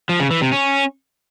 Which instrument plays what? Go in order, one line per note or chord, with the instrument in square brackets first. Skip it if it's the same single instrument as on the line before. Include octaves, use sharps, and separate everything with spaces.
[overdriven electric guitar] F3
C#3
E3
C3
C#4